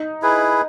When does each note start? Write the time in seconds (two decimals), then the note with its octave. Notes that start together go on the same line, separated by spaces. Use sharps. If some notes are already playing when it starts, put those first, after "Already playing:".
Already playing: D#4
0.22 E4 G#4 B4